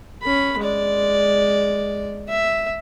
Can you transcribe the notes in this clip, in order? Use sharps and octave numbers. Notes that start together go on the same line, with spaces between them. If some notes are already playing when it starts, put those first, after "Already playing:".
C#4 B5
G#3 D5
E5